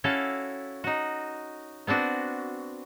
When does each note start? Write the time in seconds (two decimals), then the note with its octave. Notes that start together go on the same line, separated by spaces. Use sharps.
0.04 C#4 E4 F#4 A4 F5
0.84 D#4 F#4
1.87 B3 C4 D4 F#4